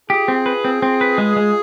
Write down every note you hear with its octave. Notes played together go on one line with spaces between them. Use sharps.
F4 G4 G#4
C4
B4
C4
C4
B4
G#3
G#3